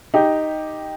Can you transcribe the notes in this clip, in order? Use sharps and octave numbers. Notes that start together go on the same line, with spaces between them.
D#4 G4